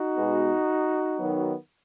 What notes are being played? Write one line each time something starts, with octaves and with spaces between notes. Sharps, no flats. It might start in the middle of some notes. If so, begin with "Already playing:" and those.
Already playing: D#4 F#4
B2 G#3 B3
D#3 F#3 B3